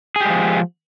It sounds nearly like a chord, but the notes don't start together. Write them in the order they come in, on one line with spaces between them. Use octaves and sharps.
G#4 G4 G#3 F3